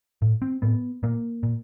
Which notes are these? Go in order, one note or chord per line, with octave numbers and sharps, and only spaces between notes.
A2
C4
A2 B3
A#2 A#3
A#2